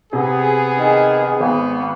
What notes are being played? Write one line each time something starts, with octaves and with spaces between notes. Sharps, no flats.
C3 B3 G#4
D#3
G#1 B3